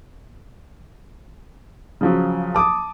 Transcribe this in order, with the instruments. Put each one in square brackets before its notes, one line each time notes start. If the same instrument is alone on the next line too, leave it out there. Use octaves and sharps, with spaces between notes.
[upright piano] C#3 F3 F#3
[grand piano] A5 D6 D#6